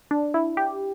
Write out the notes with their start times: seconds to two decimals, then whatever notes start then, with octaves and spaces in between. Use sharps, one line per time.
0.11 D4
0.34 E4
0.57 G4